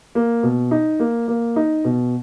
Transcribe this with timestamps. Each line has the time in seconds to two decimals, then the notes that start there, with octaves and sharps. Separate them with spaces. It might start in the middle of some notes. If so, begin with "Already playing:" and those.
0.15 A#3
0.43 B2
0.71 D#4
1.00 A#3
1.28 A#3
1.56 D#4
1.85 B2